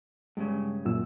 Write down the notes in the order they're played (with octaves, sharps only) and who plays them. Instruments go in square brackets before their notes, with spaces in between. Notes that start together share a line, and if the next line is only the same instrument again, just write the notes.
[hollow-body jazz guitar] G2 C#3 [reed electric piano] G#3
[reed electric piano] F#2 A#2 E6